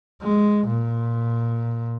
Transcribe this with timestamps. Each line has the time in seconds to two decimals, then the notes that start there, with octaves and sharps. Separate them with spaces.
0.22 G#3
0.68 A#2